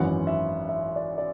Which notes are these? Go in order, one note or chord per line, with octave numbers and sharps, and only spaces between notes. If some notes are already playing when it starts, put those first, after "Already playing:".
Already playing: G#1 F#2 E3 F#5
E5
E5
D5
D5